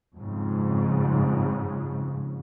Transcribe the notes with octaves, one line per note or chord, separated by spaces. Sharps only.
F2 G#2 C#3